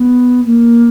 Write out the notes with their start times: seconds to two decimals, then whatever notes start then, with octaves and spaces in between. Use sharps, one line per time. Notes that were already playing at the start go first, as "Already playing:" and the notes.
Already playing: B3
0.45 A#3